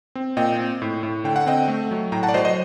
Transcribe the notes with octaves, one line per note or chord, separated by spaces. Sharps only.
C4
A#2 D#5 G5
C4
A2
A2
D3 G5
F#5
C4 D#5 G5
A3
F#3
A2 G5 A#5
F#5 A5
D5
F#3 C5 D#5
C5 D#5